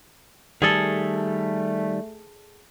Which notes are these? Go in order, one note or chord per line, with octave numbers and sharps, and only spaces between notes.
D#3 G3 A3 G#4 A4